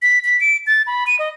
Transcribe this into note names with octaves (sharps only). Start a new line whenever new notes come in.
B6
B6
D7
A6
B5
D#7
D#5